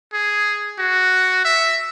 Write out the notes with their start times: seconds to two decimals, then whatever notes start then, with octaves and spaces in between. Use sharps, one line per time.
0.14 G#4
0.79 F#4
1.45 E5